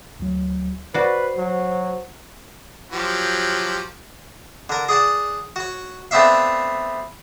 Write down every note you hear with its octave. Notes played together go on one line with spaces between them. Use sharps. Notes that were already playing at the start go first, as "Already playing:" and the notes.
D2 F#3
F#4 B4 C5 D5 C7
F#3
F3 F#3 G4
D3 A#4
G#4 D5 F#5 A5
F#4 C#5
A3 B3 C4 D4 E5 F5